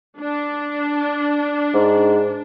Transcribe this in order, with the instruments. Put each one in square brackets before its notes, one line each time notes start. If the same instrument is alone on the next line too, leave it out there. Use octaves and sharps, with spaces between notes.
[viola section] D4
[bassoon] G#2